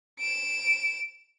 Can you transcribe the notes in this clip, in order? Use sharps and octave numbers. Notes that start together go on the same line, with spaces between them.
D7 E7